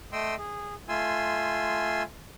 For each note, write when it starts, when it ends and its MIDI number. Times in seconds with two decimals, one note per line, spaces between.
0.12 0.35 57
0.12 0.35 75
0.12 0.35 79
0.12 0.35 84
0.12 0.35 88
0.38 0.74 68
0.89 2.03 57
0.89 2.03 65
0.89 2.03 80
0.89 2.03 84
0.89 2.03 88